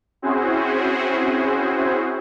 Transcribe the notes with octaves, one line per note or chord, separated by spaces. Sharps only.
C4 C#4 E4 F#4 G#4 C5